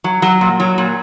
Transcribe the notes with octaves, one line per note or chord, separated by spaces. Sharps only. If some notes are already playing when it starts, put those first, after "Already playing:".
F#3
F#3
A#2
F#3
A#2